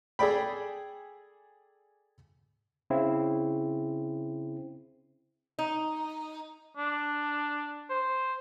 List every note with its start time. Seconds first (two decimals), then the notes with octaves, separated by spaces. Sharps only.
0.19 G#4 A4 D5 G5 B5
2.90 C#3 C4 E4
5.59 D#4
6.77 D4
7.90 C5